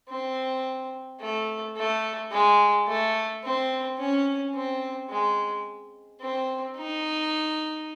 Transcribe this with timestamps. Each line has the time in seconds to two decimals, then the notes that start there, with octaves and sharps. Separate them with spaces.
0.09 C4
1.21 A3
1.77 A3
2.32 G#3
2.88 A3
3.44 C4
3.99 C#4
4.55 C4
5.10 G#3
6.21 C4
6.77 D#4